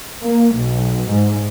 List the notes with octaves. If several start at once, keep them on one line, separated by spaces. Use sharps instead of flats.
A#3
B1
G#2